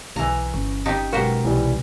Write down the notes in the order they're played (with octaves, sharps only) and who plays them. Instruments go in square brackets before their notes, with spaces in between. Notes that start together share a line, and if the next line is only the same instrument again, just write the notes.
[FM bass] B1 [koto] E3 A#5
[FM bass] G1 [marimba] C#4
[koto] D#4 G4
[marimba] B2 F#3 G#3 [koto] F#4 G4 C5 [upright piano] A#4
[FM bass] B1 [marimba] C3 [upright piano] E3 G3